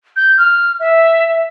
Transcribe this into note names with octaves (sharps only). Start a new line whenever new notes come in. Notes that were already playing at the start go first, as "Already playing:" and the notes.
G6
F6
E5